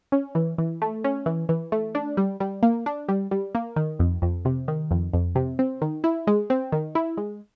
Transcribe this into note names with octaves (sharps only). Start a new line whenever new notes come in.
C#4
E3
E3
A3
C#4
E3
E3
A3
D4
G3
G3
A#3
D4
G3
G3
A#3
D#3
F2
F2
C3
D#3
F2
F2
C3
C4
D#3
E4
G#3
C4
D#3
E4
G#3